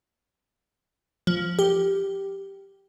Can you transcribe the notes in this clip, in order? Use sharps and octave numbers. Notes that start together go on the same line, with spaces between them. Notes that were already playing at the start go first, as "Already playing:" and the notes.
F3
G4